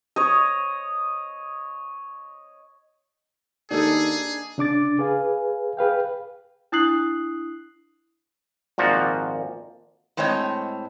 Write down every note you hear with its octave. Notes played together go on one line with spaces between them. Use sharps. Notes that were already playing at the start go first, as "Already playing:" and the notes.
C#5 D#5
D#2 D4 D#4 G#4 A4
C#3 D4 D6 A6
G#4 B4 F5 G#5
G#4 B4 F5 G5
D4 E4 D#6 F#6 C7 F#7
G#1 A#2 F3 F#4
A2 G#3 C4 C#5 D#5